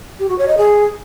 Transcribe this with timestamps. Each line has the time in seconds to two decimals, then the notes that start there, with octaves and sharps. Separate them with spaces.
0.19 G4
0.29 F#4
0.38 C#5
0.48 D#5
0.58 G#4